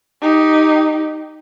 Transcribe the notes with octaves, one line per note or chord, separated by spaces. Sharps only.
D#4 G4